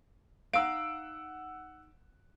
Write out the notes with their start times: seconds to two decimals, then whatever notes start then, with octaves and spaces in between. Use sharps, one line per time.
0.53 D#4 F5 F#5 E6 D7